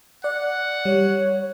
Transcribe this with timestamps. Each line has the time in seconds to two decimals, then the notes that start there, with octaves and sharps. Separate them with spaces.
0.24 D5 F#5
0.85 G3 C#5